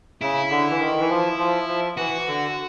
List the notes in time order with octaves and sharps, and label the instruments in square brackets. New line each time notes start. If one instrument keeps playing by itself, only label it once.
[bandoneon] C#3 [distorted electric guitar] E4
[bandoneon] D3
E3
D#3
E3
F3
F3
F3
[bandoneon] E3 [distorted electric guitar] F#4
[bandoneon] D3